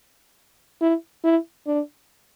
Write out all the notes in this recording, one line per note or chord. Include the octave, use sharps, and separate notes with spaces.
E4
E4
D4